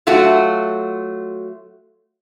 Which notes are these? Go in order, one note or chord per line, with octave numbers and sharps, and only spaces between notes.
F#3 A3 F4 F#4